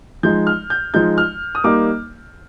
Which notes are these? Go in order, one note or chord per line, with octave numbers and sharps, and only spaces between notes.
F3 G#3 D#4 G6
F6
G6
F3 G#3 D#4 G6
F6
D#6
G3 A#3 D#4 D6